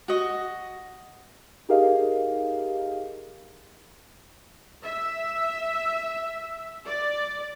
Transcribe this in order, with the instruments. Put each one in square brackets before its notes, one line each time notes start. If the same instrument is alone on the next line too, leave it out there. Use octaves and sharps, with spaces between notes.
[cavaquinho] F#4 D#5
[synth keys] D#4 G4 G#4 A#4 D#5 F5
[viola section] E5
D5